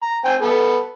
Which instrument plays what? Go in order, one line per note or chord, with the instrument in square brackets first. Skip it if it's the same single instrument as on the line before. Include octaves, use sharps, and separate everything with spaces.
[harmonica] A#5
C4 G5 G#5
B3 A4